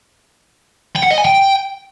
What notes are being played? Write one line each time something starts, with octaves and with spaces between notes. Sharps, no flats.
G5
F#5
D#5
G#5
G5